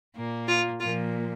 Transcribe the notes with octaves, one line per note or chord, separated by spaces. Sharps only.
A#2 A#3
F4
A#2 F3 A#3 F4